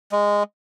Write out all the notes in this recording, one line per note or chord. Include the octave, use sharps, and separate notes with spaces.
G#3